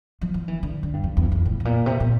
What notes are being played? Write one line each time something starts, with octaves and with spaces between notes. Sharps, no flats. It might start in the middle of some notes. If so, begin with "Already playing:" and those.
F3
F3
E3
D3
D3
G2
F2
E2
F2
A2
A2
A#2
C3
A#2